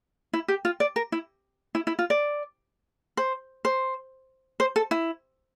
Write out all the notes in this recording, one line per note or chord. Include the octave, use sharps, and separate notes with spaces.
E4
G4
F4
D5
A#4
E4
E4
E4
F4
D5
C5
C5
C5
A4
E4